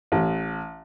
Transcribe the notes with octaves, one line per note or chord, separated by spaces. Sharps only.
A1